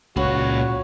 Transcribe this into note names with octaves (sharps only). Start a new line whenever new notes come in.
C#2 A#2 F#4 C#5 B5